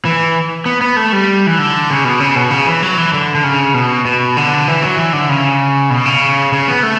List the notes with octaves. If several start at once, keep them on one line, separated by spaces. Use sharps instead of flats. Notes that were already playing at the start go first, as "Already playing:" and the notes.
E3
B3
B3
A3
G3
E3
D3
C#3
B2
C#3
B2
C#3
E3
F#3
E3
D3
D3
C#3
B2
B2
D3
E3
F#3
E3
D3
C#3
B2
C#3
C#3
B3
A3